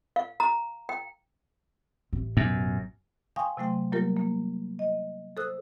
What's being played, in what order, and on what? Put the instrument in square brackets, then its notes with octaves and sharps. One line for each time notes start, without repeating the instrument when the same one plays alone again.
[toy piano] F5
A#5
G5
[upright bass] A1
[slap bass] F#2 [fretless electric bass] B2
[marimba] F5 G5 G#5 C6 C#6 D#6
C3 F#3 A3 G5 C6
F#3 G3 A#3 F4 G4 A#4
A#3
D#5
A4 C5 D#6 E6 F#6